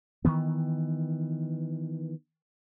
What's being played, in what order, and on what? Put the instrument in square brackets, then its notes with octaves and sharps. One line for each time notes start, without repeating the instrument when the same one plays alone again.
[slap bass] D#3 E3 B3